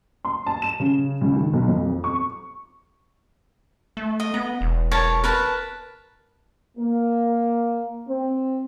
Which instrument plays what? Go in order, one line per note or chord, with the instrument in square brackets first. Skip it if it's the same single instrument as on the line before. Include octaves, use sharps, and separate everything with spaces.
[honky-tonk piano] C6
A5
E7
C#3
C#2
D#3
B1
F2
C#6
[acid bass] A3
[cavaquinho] D#5
[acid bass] B3 [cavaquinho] A#5
[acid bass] E1
[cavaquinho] A#4 C#5 A5
A#4 B4 A5
[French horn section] A#3
C4